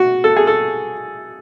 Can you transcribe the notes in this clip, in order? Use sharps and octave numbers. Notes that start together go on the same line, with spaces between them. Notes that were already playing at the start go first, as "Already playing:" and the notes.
Already playing: F#4
A4
G#4
A4